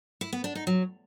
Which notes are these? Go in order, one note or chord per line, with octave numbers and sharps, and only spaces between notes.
E4
B3
D4
D#4
F#3